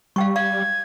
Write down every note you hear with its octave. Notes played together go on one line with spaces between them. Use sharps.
G3 F5 G5 C#6
F5 G#6